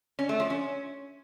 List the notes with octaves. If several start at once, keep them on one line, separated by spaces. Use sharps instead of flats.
C#4
A3
F3
C#4